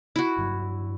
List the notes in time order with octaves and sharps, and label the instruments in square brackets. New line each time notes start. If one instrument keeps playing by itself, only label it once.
[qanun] E4 F#4
[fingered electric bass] G1 G2 F#3